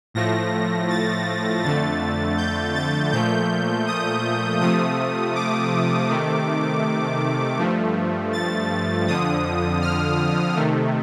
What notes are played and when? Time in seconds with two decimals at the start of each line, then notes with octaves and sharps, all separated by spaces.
0.14 A2 F3 A3 A#6
0.90 A6
1.63 F2 D3 A3 A6
2.37 G6
2.75 A6
3.12 A#2 F3 A3 G6
3.87 D#6
4.61 C3 F3 A3 D#6
5.35 D6
6.10 C3 D#3 A3
7.58 G2 F3 A3
8.33 A6
9.07 F2 D3 F3 D#6
9.82 F6
10.56 C3 D#3 A3